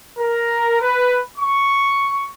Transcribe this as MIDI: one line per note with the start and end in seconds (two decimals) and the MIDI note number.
0.19 0.77 70
0.81 1.19 71
1.37 2.29 85